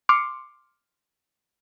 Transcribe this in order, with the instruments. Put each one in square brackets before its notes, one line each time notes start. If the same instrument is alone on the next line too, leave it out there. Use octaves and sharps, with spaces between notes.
[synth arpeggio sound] C6 D6 F6 C7 C#7